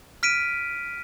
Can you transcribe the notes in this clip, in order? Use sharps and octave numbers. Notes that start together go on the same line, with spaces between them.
F6 B6 D7 D#7